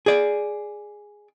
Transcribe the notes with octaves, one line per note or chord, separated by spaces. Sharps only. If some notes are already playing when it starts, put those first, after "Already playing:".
G#4 D5